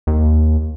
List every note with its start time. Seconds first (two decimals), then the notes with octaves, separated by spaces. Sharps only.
0.07 D#2